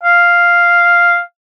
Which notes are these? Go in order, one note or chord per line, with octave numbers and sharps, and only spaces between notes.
F5